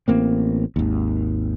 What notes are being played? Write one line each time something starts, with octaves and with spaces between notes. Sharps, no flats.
A1 A#3 C4
G#1 D#2